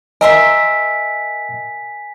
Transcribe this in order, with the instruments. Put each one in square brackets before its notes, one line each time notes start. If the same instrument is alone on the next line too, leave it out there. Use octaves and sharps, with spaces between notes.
[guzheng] A#4 E5 C6 [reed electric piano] D#5 [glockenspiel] G#5 B6